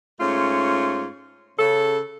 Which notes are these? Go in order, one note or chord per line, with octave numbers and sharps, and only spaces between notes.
G#2 A3 C#4 F4
C#3 A4